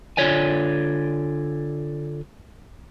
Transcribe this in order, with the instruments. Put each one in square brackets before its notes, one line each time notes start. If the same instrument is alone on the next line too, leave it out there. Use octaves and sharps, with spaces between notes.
[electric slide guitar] D3 F4 C#5 D5 G#5